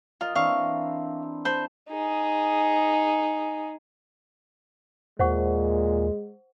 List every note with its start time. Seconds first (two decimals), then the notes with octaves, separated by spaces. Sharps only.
0.21 F4 A#4 D#5
0.35 E3 C4 D4 F5 C#6
1.45 C5 A5 B5
1.90 D#4 G#4
5.20 D#2 A#2 G#3 C5 F#5 C#6